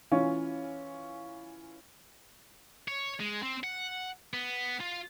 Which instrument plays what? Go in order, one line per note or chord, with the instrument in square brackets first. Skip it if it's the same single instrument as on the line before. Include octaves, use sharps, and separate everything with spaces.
[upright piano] E3 C#4 F4 C#5
[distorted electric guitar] C#5
G#3
C4
F#5
B3
F4